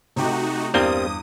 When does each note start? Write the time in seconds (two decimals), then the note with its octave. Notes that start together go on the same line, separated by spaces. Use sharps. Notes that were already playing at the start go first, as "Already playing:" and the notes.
0.16 C3 A3 D#4 F#4 G4
0.74 E2 G2 G3 A#3 C4 D#6 G7